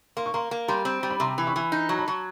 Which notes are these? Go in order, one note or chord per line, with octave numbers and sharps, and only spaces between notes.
A#3 C6
C#6
A#3 A#5 C6
A#3
G3 A#5 C6
C4
G3
B5
C3 A#5 C6
E3
B5 C#6
E3
D#4
F#3
A5 B5
F#3